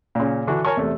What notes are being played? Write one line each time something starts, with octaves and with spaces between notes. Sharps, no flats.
A#2 C#3
D3 E3 D4 F#4
A#4 C#5 G#5 A5 C#6
E2 C3 A3